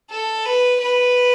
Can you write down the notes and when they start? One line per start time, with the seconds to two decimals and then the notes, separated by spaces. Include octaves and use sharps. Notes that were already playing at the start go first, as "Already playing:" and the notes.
0.10 A4
0.45 B4
0.80 B4